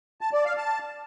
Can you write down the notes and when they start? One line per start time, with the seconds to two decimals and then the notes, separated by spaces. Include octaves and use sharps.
0.21 A5
0.33 D5
0.45 F5
0.57 A5